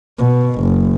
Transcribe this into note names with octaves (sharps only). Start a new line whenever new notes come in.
B2
F#1